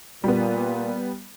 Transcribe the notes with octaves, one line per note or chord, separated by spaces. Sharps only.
A#2 G3 B3